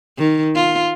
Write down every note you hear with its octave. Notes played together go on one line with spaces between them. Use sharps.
D#3
F4